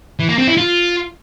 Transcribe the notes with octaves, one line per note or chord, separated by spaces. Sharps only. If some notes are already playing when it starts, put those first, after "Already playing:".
E3
A#3
C4
E4
F4